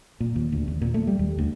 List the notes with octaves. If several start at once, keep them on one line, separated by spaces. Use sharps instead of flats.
A#2
D#2
D2
D#2
A#2
A3
G3
D#2
D2